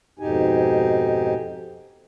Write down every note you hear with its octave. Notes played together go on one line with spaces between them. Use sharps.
F2 G#2 B2 D#4 G4 G#5